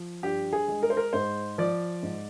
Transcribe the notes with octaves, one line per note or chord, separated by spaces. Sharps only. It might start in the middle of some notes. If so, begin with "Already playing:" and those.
Already playing: F3
G2 G4
G#4
G#3
A#4
C5
A#4
G#2 C5
F3 D5
G#2